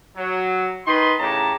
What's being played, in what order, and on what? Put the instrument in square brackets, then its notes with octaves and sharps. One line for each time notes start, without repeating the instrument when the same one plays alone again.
[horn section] F#3
D#3 D#4 B4 C6
A2 C#3 G4 A5 A#5